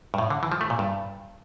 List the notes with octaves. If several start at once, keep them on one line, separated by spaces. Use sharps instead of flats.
G2
A2
D3
E3
F3
A3
A#2
G2